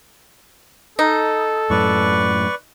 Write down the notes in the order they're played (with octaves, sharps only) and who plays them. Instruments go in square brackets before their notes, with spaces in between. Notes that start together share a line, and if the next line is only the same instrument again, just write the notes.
[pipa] D#4 [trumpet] A4
[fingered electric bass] F#2 A2 [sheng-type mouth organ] B4 D5 C#6